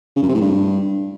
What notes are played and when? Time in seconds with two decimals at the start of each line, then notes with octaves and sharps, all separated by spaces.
0.16 C#3
0.22 F#2
0.28 C3
0.35 A2
0.41 G2